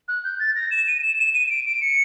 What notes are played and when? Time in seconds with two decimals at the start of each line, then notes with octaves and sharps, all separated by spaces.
0.08 F#6
0.24 G6
0.39 A6
0.55 A#6
0.71 E7
0.87 D#7
1.02 E7
1.18 E7
1.34 D#7
1.47 D#7
1.50 D7
1.65 D7
1.81 C#7